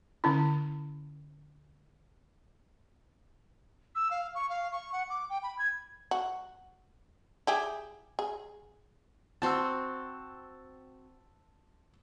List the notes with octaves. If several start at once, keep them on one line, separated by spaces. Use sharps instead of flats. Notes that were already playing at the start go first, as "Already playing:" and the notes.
D3 C#4 E4
E6
F5
C#6
F5
C#6
F#5
D6
G5
B5
G#6
F#4
E4 G4 G#4
G#4
C4 F#4 A5 C6 E6